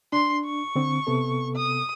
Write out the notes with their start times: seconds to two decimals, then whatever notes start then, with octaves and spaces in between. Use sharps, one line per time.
0.13 D4 C6
0.45 C#6
0.76 D3 C4
1.07 C3 B3 A4
1.56 D#6